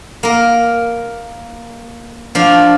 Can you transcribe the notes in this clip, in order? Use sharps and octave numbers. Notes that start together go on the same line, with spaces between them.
A#3 A#4
F3 D4 F5